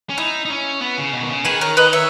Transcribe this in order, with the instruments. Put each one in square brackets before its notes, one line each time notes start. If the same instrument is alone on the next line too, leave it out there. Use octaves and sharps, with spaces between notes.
[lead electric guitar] C#4
[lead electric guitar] D#4 [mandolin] E4
[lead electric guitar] D#4
C#4
B3
C#3
B2
D#3
C#3
[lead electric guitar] D#3 [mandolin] G#4 B4
[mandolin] A#4 C#5
B4 D#5
C#5 E5